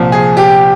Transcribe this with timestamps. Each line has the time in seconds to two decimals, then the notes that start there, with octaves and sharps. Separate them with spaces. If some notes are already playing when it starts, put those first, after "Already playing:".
Already playing: C2 A#2 F3
0.12 G#4
0.37 G4